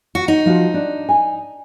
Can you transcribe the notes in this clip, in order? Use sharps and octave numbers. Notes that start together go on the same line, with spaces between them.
F#4
D#4
F3 F4 F#4
D4
G#5